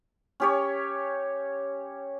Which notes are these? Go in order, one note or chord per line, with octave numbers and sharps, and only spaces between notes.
C#4 G4 C#5